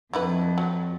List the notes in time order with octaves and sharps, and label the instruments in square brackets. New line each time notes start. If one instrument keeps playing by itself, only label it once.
[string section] F2 [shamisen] D3 E4 B4
[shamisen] F3 F#3